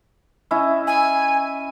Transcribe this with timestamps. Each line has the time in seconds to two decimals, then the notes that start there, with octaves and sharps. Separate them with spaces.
0.51 C#4 E4 D#5
0.87 G#5